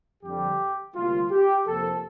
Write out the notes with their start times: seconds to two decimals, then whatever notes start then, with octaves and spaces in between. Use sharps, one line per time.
0.23 F2 D3 G3 G4
0.95 D2 C3 G3 A#3 F4
1.31 G4
1.66 F2 C3 F3 A#3 A4